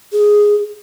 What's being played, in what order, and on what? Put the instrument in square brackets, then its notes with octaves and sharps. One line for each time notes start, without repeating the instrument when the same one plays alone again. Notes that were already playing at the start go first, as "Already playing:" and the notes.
[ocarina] G#4